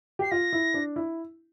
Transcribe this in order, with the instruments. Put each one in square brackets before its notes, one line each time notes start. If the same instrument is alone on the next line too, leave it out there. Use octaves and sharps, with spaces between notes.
[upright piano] G4 [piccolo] C7
[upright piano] F4 [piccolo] A#6
[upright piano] E4
D4
E4